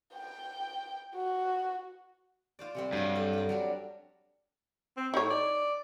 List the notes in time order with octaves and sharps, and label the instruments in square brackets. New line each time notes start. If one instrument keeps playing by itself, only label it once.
[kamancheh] G5
F#4
[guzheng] F4 C5 D5
C3 G3 C4
[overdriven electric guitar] G2 [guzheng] F#3 D4
[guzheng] A4
F4 A#4
F#3 G3 D4
[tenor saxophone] C4
[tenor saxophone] A2 [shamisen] D#4 C#5
[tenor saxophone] D5